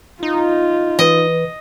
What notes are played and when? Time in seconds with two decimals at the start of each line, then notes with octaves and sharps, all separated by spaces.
0.23 D#4 F4
0.99 E3 B4 D#5